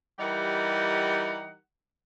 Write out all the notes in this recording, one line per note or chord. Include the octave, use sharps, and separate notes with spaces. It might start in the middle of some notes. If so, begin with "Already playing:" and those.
E3 G3 D#4 G4 A#4 F#5